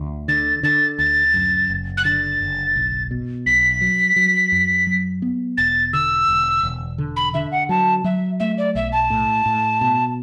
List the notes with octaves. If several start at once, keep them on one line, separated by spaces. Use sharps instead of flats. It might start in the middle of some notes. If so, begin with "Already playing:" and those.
Already playing: D2
D3 A6
D3 A6
D2 A6
F#2
F#1
F#6
D3 A6
F#1
B1
B2
B1 B6
F#3
F#3
F#2
F#3
B3
E1 A6
D3 E6
E1
E1
D3
B5
D3 E5
F#5
F#3 A5
F#3 E5
A3 E5
D5
B1 E5
A5
A2
A2
B2